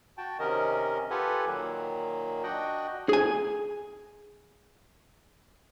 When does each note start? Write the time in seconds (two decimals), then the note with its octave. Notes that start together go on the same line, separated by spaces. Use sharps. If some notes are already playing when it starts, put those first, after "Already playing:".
0.18 F#4 G5 A5
0.39 C3 D#3 C#4 A#4 D#5
1.10 F4 G4 A4 B4 F#5 G#5
1.46 A#2 D#3 F#3 A#3
2.43 D4 F#4 D#5 F#5 G5
3.09 G#4 G#5